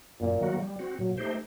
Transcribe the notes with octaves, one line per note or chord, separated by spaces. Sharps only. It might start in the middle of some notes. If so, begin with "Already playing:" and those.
F#2 A#2
D#3 F#3 A#3 F#4
G3
C4 F#4
A#2 F#3
A3 D#4 G4 C5